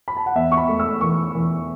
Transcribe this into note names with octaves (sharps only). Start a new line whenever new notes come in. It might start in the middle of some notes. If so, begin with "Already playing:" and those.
B5
A5
F#5
E2 E5
C#6
B5
A3
E6
E3 C#6
E3